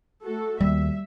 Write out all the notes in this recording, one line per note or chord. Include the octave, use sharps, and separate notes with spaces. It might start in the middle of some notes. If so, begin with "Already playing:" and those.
A3 F#4 A4
D#2 G3 E5